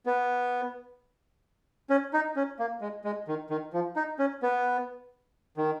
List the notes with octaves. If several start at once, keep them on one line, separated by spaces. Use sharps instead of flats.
B3
C#4
D#4
C#4
A#3
G#3
G#3
D#3
D#3
F3
D#4
C#4
B3
D#3